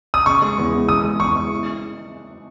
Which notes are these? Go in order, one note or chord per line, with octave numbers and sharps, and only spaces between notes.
D#6
C#3 C#6
G#3
E2
E2
C#3 D#6
G#3
E2 C#6
E2
E4